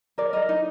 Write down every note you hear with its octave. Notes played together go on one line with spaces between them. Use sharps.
A#4 D5
A#4 D#5
D#4